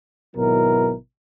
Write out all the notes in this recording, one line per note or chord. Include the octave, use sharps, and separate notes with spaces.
G#1 B2 F#3 E4 A#4